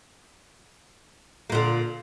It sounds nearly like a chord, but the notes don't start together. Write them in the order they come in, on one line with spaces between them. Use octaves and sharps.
A#3 A#2 D3